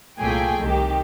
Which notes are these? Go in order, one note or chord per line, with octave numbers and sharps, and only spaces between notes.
C2 A#2 A3 G#4 G5 G#5
C2 D#3 G4